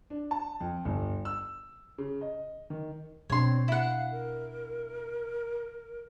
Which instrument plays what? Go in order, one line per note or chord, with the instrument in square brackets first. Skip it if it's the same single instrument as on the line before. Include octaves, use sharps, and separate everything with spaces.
[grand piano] D4
A5
F2
G1
E6
C#3
D#5
D#3
[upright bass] B2 D4 [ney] C4 [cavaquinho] C#5 C6
[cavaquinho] E4 F#5 [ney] F5
[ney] A#4